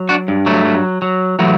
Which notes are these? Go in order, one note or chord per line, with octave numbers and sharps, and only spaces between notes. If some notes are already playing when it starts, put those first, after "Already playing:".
Already playing: F#3
D4 F#4
G2
F#3 A3
F#3
F#3
E3 F#3 A3